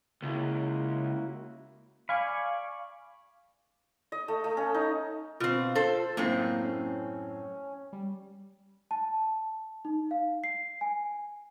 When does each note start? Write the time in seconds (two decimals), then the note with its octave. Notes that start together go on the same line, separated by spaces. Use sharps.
0.23 C#2 A#3 E4 F#4
2.09 D5 F5 G#5 B5 C#6
4.12 D#5
4.28 A3
4.44 A3
4.57 C#4
4.74 D#4
5.40 B2 C4 F4
5.75 A4 C5
6.17 F#2 A2 A#3 C4
6.64 C#4
7.93 G3
8.91 A5
9.85 D#4
10.11 F5
10.44 C7
10.81 G#5